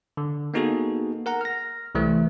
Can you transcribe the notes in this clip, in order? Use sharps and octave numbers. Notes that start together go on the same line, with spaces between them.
D3
A#3 B3 D#4 F#4 G#4 A4
A#4 F#5 A#5
F6 A#6
C2 E3 A3